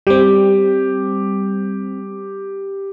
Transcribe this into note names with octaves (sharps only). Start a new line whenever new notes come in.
G3 C4 G4